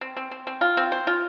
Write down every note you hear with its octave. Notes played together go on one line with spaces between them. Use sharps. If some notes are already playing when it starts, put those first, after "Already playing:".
C4
C4
C4
C4
F4
C4
C5
F4